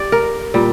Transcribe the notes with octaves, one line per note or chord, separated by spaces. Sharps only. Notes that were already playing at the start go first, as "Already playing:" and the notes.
Already playing: G4 D5
A#4
A#2 G3